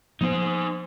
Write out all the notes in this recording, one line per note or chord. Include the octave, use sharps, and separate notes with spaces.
F3 A#3 B3 D#4 C5